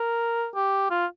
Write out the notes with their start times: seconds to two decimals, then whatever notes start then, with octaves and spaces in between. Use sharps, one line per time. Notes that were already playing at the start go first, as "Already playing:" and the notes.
Already playing: A#4
0.55 G4
0.90 F4